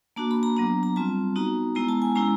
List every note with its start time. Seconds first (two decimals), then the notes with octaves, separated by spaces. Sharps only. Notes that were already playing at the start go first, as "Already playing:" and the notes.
0.16 A#3 D4 F#4 A5
0.31 B5
0.43 A#5
0.56 F#3 B3 D4 A#5
0.83 A#5
0.96 G3 C4 F4 A5
1.36 B3 D#4 F#4 A#5
1.75 G#3 B3 E4 A#5
1.88 A5
2.02 G#5
2.15 G#3 C#4 E4 A#5